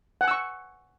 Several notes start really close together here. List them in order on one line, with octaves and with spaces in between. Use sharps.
F#5 G#5 E6 C#6